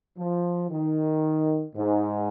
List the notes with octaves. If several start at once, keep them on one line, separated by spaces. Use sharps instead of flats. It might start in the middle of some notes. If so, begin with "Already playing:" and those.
F3
D#3
G#2